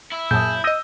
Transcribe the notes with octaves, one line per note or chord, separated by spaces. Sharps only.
E4
F#2 A#2 G#4 A5 D#6 G6
D#5 D#6 E6 G6 A#6 D#7